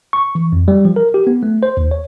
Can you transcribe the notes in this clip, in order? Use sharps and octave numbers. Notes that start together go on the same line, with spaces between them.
C#6
E3
F2
G3
F3
A#4
G4
B3
A3
C5
D#2
C#5